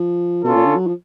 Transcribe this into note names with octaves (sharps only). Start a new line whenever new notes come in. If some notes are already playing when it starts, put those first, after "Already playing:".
Already playing: F3
B2 C#4 F4 A4
A#2
D3
F#3
F3